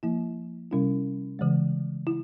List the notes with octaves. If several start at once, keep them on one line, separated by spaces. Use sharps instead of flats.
F3 A#3 E4
C3 G3 C#4 E4
C#3 E3 G#3
E4